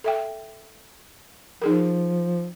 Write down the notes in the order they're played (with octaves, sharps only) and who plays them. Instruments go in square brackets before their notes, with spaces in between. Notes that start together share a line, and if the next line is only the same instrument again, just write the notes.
[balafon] A4 E5 G5
[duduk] F3 [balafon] D#4 G#4 A#4